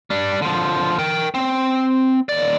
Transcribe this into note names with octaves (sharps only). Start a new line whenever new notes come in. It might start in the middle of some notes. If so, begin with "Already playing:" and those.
G3 D4
D3 F3
A#4 G5
C4
D#2 D5